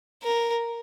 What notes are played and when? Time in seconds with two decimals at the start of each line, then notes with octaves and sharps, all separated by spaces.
0.23 A#4